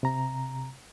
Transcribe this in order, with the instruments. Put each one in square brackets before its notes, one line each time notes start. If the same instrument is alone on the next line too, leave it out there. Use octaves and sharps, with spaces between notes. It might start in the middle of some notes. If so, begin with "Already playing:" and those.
[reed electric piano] C3 A#5